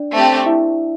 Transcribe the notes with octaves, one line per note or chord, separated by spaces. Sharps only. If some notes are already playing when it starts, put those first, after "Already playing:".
Already playing: D4 D5
A3 C4 G4
E4 E5